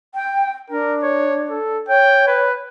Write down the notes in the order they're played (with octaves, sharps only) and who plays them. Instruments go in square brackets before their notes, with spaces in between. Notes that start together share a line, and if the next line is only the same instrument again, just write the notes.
[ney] G5
[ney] D4 [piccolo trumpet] A#4
[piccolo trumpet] C#5
A4
[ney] C#5 [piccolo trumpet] G5
[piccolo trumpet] B4